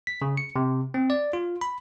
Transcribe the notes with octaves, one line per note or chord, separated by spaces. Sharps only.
B6
C#3
C#7
C3
C4
D5
F4
B5